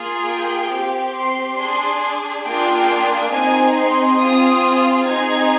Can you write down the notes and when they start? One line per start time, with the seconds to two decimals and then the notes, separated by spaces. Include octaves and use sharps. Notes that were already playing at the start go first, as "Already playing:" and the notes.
Already playing: A#3 F4 G#4
0.27 G5
0.71 C4 G4
1.15 C6
1.59 D4 G#4
2.45 A#3 D4 F4 G#4 G5
3.32 C4 D#4 G#4 G#5
3.76 C6
4.19 C4 F4 G#4 D#6
5.07 C4 D#4 G#4 G#6